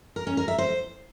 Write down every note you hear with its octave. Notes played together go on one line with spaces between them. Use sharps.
A#4
C#4
A#4
E5
C5